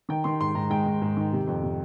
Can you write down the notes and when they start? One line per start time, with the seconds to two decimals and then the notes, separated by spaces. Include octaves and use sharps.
0.09 D#3 G5
0.24 D#3 C6
0.40 G#2 C6
0.55 G#2 A#5
0.70 G#2 G5
0.86 G#2
1.02 G#2
1.17 D#3
1.33 C3
1.47 F2
1.62 C3